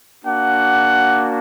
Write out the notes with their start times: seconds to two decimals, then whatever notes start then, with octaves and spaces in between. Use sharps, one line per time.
0.23 A#3 D4 F#4 F#5